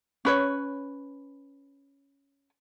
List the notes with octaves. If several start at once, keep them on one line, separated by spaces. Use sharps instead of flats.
C#4 B4 C#5